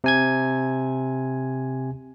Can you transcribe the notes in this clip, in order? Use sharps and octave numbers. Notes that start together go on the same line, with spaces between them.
C3 G#5 G#6